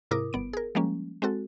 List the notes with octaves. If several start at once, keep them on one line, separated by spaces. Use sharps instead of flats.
G#2 C3 E4 A#4 D6 D#6
G1 B3 D7
G#4 A#4
F3 G3 G#3 A#3 C#4
G#3 C4 F#4 A4